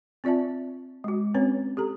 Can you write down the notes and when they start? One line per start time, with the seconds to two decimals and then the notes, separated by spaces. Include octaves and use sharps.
0.24 C4 F4 D5 E5 A5
1.04 G#3 F#4
1.34 C4 C#4 B4 C#5
1.77 G4 A4 A#5